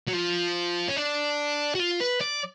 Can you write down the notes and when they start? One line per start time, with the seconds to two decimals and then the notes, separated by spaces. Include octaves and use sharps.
0.08 F#3
0.14 F3
0.88 C#4
0.96 D4
1.75 F#4
1.80 F4
2.00 B4
2.21 D5